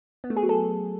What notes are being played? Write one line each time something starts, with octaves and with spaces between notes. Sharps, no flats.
B3
A3
G#4
F#3
A4